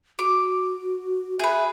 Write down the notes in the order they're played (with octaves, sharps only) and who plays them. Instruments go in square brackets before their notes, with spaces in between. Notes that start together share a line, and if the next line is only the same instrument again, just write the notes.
[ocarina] F#4 [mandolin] D6
[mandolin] G#4 B4 [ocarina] E5